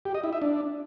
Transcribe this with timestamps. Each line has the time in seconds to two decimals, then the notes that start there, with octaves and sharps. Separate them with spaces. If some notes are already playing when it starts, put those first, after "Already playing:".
0.05 G4
0.15 D#5
0.24 E4
0.33 E5
0.42 D4